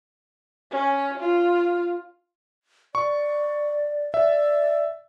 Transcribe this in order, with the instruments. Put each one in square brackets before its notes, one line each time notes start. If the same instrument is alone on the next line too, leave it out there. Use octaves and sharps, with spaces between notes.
[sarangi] C#4
F4
[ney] D5 [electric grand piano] C#6
[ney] D5 [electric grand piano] E5